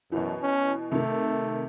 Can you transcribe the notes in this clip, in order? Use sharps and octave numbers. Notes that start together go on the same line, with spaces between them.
F#2 B2 E3
C#4
C3 D#3 A3